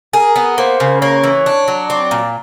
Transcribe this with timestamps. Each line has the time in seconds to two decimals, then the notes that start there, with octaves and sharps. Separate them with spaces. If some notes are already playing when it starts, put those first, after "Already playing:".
0.13 G#4 A#4
0.36 B3
0.58 A#3 C5
0.80 C#3
1.01 A#3 C#5
1.24 E3
1.46 D4
1.68 F#3
1.90 C4 D5
2.11 A#2